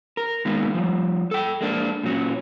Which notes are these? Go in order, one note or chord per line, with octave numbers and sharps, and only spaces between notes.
A#4
D#3 G#3 A#3 B3
F3 G3
A4 G5
G#3 A#3 D4
A#2 F#3 C#4